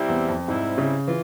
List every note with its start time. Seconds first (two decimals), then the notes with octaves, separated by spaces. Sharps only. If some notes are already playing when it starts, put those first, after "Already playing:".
Already playing: C3 G3 C4 E4
0.08 E2
0.28 F2
0.47 G#2 C3 G3 C4 E4
0.78 C#3
1.08 E3 F4